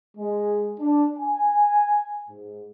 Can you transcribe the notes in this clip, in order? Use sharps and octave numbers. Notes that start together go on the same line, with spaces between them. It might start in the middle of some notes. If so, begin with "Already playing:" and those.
G#3
D4
G#5
G#2